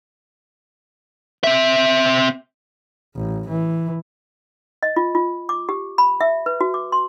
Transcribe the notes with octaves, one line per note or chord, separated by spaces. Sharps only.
C4 E5
A1
E3
D#5
F4
F4
D6
G4
B5
E5
B4
F#4
D6
C6